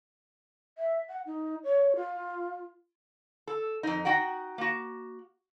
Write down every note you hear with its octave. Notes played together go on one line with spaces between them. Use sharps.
E5
F#5
D#4
C#5
F4
A4
F2 D#4
D#4 F#4 F#5 G5
A#3 F#4